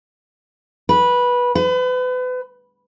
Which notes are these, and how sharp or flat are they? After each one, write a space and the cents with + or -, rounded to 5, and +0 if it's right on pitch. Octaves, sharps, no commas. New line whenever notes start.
B4 -15
B4 +35